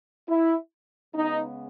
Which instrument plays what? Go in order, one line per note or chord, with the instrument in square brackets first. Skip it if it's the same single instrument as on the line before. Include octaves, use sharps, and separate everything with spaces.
[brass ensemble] E4
C#3 G#3 B3 D#4